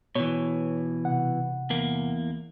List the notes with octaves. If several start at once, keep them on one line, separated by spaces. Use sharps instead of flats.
B2 E3 C#5
C3 F#5
E2 A#3